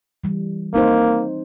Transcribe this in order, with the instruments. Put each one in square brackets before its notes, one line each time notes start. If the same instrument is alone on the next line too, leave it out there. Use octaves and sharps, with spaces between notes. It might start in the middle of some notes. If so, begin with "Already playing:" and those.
[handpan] E3 G3
[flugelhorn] A#3 [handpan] C4 D#4 C5